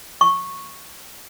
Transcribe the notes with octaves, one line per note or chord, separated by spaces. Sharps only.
C#6